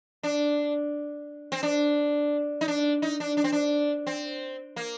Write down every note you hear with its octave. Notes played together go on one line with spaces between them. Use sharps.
D4
C4
D4
D#4
D4
D#4
D4
D4
C4
D4
C4
A#3